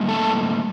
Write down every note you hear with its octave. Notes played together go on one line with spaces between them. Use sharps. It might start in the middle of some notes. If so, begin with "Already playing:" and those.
Already playing: A2 G3 A#3
A4